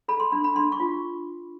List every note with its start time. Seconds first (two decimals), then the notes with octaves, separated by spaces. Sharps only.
0.08 A4 B5
0.20 C6
0.32 D4 B5
0.44 B5
0.55 D4 C6
0.72 C#6
0.80 F4